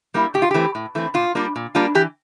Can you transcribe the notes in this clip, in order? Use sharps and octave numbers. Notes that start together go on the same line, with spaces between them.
G3 A#3 E4
A2 G4
F4
E3 A3 C4 G4
A2
E3 A3 C4
A#2 F4
G3 A#3 D4 F4
A#2
G3 A#3 D4 F4
E3 G4